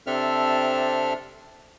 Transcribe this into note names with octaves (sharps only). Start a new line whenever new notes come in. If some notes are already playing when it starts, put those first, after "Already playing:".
C3 C4 D4 A4 E5 F6